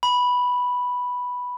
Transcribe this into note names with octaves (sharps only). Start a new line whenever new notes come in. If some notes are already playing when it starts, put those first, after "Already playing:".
B5